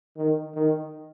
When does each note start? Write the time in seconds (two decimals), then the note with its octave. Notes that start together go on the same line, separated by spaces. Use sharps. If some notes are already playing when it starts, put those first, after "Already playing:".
0.17 D#3
0.55 D#3